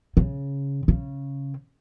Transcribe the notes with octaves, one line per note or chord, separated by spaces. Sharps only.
C#3
C#3